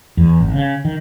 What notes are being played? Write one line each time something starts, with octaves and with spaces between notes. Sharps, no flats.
E2
G#1
C#3
D#3